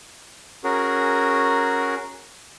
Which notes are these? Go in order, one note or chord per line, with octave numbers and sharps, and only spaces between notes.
C#4 F#4 G#4 A#4